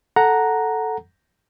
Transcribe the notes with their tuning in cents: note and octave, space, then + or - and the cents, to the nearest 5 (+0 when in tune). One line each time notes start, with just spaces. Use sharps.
A4 +0 F#5 +0 A#5 +0